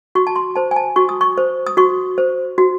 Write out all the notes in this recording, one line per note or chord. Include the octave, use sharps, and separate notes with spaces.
F#4 C#6
A5
C6
C5 A5
G#5
A5
F#4 C#6
D#6
C#6
C5
D#6
F#4 C#6
C5
F#4